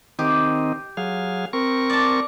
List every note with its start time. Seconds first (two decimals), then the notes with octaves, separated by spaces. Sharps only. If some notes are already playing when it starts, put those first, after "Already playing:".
0.19 D#3 C4 D#4 G4
0.97 F#3 G#4 F5
1.53 C4 A#4 C#6
1.90 D5 A5